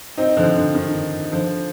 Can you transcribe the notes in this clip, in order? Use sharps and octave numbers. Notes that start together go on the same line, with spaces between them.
C4 D#4
D3 F3
D3
D#3
D3 F3